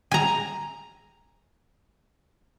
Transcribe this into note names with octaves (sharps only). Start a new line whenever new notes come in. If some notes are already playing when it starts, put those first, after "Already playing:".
G#5 A#5